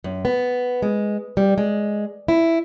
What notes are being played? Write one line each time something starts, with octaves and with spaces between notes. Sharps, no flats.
F#2
B3
G#3
G3
G#3
E4